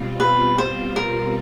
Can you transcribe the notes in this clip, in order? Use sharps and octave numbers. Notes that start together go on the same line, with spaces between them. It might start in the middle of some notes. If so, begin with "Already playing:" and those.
Already playing: B2 G3 C4 F4
B4
C5
A#4